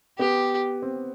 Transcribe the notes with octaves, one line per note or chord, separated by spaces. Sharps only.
B3 G4
C4